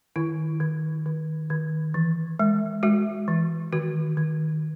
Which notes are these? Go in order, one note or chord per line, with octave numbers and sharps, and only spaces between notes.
D#3 E4
D#3
D#3
D#3
E3
G#3
G#3 F#4
E3
D#3 F#4
D#3